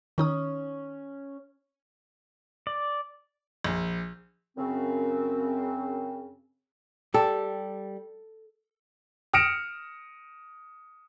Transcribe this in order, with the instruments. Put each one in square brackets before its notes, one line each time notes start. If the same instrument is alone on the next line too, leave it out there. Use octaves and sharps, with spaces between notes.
[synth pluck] D#3 D#4 D#6 [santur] C#4
[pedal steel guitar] D5
[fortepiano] A#1
[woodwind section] F#2 C#3 C4
[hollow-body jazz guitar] G3 G4 [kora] A4
[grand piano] D#6 F6 A#6 C#7 D7 E7